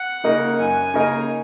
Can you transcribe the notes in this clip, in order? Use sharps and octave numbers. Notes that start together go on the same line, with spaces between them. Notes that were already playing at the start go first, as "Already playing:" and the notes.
Already playing: F#5
C#3 A#3 D#4 A#4
F#2 G#5
C#3 A#3 D#4 A#4